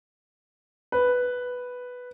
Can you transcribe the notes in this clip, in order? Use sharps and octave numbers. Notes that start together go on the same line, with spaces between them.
B4